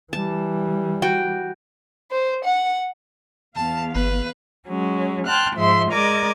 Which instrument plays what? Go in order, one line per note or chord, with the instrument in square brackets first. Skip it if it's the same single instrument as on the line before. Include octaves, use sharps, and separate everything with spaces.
[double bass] E3 G3 [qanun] A5
[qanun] F#4 G5
[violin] C5
F#5
[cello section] E2 B3 F5 [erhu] A5
[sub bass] G1 [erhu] B4
[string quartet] F#3 G#3 C#4
G5 A5 C6 F6 F#6
G#2 F3 G#3 E5 C6
G#3 A#4 D5 D#5 D6 G#6